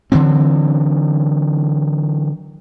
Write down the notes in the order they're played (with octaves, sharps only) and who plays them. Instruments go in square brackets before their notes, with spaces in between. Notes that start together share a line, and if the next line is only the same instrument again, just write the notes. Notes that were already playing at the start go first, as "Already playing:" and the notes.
[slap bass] D3 E3 F#3 C4